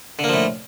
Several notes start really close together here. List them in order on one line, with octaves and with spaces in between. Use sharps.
D3 A#3 F3 A2